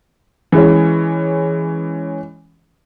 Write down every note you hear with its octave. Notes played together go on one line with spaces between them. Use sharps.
E3 G#3 C#4